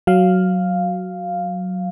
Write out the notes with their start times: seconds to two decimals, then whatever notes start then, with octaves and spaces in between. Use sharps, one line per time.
0.07 F#3 F5